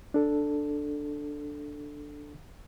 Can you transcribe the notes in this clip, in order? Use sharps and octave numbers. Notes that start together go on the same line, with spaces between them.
D4 A4